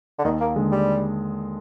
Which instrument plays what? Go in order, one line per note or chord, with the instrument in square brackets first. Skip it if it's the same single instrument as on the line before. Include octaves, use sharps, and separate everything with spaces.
[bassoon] D3
[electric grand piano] D#2 [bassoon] D#3
[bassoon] A#3
[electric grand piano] D3 G#3
[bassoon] G3